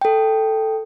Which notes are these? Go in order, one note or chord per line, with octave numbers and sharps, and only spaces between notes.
A4 G5